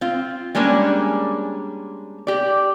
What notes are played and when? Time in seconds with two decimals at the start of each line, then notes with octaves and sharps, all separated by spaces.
0.01 C4 F4
0.55 G3 G#3 A#3 C#4 D4
2.27 G4 D5